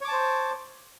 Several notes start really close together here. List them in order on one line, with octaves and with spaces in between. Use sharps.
C#5 D6 A5 C5